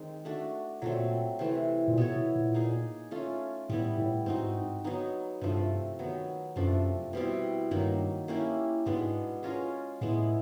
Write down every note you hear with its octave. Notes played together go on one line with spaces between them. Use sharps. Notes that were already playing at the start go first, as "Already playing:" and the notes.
Already playing: D#3 G#3 C4
A3 D4 F#4
A#2 F#3 A3 C4
C3 E3 A3
A#2
B2 B3 E4 A4 C#5
B2
A#2
A#3 D#4 G#4
A3 C#4 F4
A2 G3 B3 E4
A2
G#2 C4 D#4 F#4
F#3 B3 D#4
G2 C3 F3 A3
D#3 F#3 B3
F#2 C3 F3 A3 D4
B2 G3 C4 E4
G2 D#3 F#3 A#3
A#3 C#4 E4 G4
G#2 B2 G#3 B3 D4
G#3 C#4 F4 A#4
A2 G#3 B3 E4